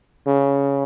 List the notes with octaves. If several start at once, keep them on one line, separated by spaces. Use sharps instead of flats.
C#3